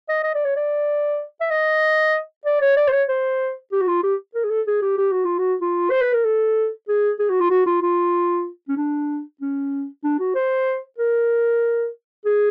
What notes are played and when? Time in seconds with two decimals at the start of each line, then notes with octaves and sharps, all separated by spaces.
0.09 D#5
0.23 D#5
0.34 D5
0.45 C#5
0.56 D5
1.41 E5
1.51 D#5
2.45 D5
2.61 C#5
2.77 D5
2.88 C5
2.92 C#5
3.09 C5
3.72 G4
3.81 F#4
3.87 F4
4.03 G4
4.35 A#4
4.44 G#4
4.50 A4
4.67 G#4
4.82 G4
4.98 G4
5.11 F#4
5.25 F4
5.39 F#4
5.61 F4
5.90 C5
6.01 B4
6.13 A#4
6.24 A4
6.88 G#4
7.19 G#4
7.30 F#4
7.40 F4
7.50 F#4
7.66 F4
7.82 F4
8.68 C#4
8.77 D4
9.41 C#4
10.04 D4
10.20 F#4
10.35 C5
10.98 A#4
12.25 G#4